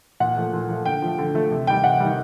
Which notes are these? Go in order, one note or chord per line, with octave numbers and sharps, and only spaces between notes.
A#2 F#5
F3 A3
A#2
F3 A3
D3 G5
F3 A3
D3
F3 A3
C3
D#3 G3 G5
C3 F#5
D#3 G3